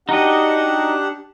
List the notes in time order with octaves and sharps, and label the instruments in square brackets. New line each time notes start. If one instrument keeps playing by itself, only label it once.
[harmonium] D4 G4 F#5 [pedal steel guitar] D#4 F#4 D#5